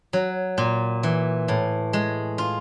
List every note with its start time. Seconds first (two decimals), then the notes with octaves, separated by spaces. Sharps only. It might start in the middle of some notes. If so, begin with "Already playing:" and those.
0.13 F#3
0.58 A#2
1.03 E3
1.48 A2
1.93 G#3
2.38 F4